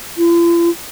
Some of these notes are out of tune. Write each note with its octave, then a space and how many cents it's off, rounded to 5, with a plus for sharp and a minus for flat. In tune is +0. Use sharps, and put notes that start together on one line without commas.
F4 -45